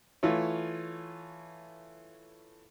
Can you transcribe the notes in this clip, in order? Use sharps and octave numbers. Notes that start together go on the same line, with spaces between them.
E3 A3 F4 C#5